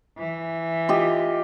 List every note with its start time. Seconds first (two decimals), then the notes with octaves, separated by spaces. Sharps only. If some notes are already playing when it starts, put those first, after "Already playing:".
0.17 E3
0.89 F4 G4 D#5